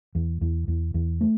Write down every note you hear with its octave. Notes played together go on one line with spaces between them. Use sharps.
E2
E2
E2
E2
A3